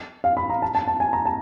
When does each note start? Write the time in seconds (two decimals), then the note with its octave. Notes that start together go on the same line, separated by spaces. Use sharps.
0.24 F5
0.37 B5
0.50 A#5
0.62 A5
0.75 A5
0.88 A5
1.00 G#5
1.13 A#5
1.26 A5